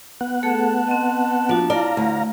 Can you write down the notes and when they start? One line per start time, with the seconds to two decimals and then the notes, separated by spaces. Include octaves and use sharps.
0.21 B3 F#5
0.43 A3 G#4 A4 A5
0.88 C4 D#5
1.49 F3 A#3 D4 F#4
1.70 E4 D5 F5 A#5
1.97 D2